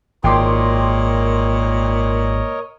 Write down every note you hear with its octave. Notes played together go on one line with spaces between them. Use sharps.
G#1 A#2 A#4 C#5 D#5 G5 C6 D6